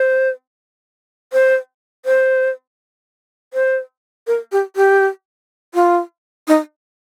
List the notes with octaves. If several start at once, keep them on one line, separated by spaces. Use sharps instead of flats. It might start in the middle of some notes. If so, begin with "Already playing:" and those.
Already playing: C5
C5
C5
C5
A#4
G4
G4
F4
D#4